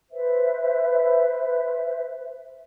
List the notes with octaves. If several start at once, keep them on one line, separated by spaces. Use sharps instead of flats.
B4 C5 E5